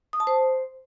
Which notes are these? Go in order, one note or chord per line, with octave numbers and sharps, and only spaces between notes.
D#6
A5
C5